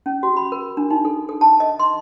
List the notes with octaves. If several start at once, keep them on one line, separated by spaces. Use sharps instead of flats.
C#4
F#4
B5
A#4
D4
D#4
A4
A4
A5
D#5
C6